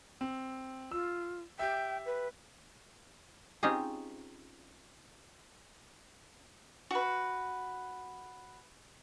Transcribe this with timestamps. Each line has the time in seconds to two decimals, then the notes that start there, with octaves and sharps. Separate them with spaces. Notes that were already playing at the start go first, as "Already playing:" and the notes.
0.21 C4
0.92 F4 E6
1.59 G4 E5 G5
2.06 B4
3.63 C4 C#4 D#4 F4 G4 G#4
6.91 F#4 B4